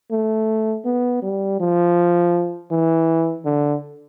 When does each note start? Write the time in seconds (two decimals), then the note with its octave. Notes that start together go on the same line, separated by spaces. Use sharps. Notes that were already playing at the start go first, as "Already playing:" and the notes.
0.11 A3
0.85 B3
1.22 G3
1.60 F3
2.71 E3
3.45 D3